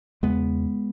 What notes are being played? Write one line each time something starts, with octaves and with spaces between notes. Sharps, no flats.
E2 C#3 G#3 B3